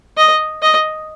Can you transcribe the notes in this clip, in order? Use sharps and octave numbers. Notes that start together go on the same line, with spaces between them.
D#5
D#5